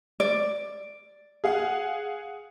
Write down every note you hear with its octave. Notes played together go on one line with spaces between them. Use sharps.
D5
G#4 F5 F#5